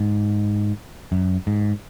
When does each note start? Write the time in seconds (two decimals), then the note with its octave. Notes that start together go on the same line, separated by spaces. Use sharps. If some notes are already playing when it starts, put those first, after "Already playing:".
Already playing: G#2
1.12 F#2
1.47 G#2